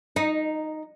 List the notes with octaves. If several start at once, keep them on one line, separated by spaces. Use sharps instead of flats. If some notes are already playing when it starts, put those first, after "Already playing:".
D#4